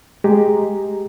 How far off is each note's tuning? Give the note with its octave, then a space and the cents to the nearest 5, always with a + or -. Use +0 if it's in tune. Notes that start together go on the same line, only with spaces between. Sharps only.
G#3 +0 G4 +0 A#5 +0